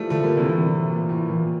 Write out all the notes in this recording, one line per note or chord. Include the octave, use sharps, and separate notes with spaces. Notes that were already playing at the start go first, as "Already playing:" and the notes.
Already playing: E3 F3 G3 A3
D3 F3 A3
G3 A#3
C3 E3
A2 C3 E3
A#2
A2
A#2 E3